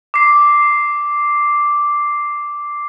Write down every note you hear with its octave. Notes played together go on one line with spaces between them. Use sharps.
D6 C7